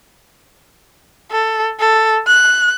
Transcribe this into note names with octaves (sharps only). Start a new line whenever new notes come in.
A4
A4
F#6